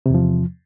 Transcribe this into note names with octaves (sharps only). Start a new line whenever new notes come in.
E2 C3 F3